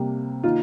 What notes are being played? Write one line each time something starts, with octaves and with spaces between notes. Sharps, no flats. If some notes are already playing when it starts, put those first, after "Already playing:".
Already playing: C3 G3 A#3
D#3 A#3 D#4 F4